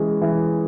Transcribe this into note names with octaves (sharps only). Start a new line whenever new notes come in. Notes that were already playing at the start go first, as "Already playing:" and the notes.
Already playing: E3 G#3 C#4
E3